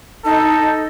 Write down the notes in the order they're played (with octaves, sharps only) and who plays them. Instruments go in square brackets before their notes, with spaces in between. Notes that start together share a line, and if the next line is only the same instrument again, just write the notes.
[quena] D#4 [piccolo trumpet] A4